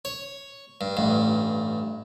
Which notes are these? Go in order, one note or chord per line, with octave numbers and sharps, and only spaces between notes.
C#5
G2
A1 G2